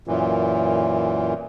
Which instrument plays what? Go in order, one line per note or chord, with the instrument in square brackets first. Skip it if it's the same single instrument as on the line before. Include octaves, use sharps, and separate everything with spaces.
[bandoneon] F#2 A#2 E3